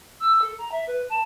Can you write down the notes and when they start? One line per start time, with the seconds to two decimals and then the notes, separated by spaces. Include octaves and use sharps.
0.20 E6
0.42 A4
0.58 A#5
0.72 E5
0.87 B4
1.09 A5